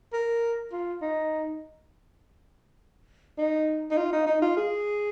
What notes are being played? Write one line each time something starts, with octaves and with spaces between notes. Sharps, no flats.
A#4
F4
D#4
D#4
D#4
F4
D#4
D#4
F4
G#4